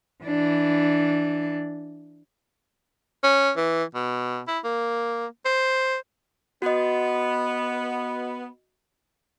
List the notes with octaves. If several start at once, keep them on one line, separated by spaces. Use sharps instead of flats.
E3 D4
C#4
E3
B2
E4
A#3
C5
B3 F#4 D#5